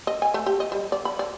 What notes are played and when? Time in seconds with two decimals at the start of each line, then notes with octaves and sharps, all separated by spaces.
0.07 D#5
0.22 G#5
0.34 A3
0.46 G4
0.60 D#5
0.72 G3
0.92 D5
1.05 B5
1.19 D5